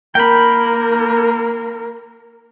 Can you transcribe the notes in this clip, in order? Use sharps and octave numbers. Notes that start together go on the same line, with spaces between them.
A#3 A#4 G5 B5